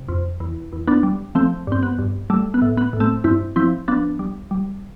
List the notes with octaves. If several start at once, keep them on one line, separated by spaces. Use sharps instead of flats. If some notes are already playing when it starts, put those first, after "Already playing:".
Already playing: C3
F2
E2
E2
B3 D4
G3
F3 A3 C4
G2 C4
B3
G2
G3 A3
B3
A2
B3
A2
A3 C4
G2 C4 E4
F3 C4 E4
F3 B3 D4
G3
G3